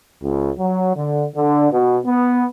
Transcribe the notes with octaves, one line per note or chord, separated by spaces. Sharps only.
C#2
F#3
D3
D3
B2
B3